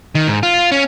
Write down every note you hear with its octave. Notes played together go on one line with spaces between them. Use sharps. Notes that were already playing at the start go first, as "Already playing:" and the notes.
D#3
G#2
F4
C#4